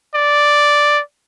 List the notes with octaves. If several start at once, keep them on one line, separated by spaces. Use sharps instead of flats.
D5